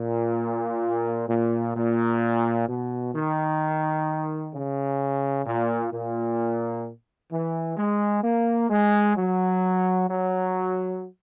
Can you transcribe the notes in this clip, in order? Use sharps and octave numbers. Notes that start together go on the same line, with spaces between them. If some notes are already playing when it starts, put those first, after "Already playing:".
Already playing: A#2
A#2
A#2
B2
D#3
C#3
A#2
A#2
E3
G#3
A#3
G#3
F#3
F#3